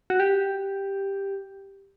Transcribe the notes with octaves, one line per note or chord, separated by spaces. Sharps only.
F#4
G4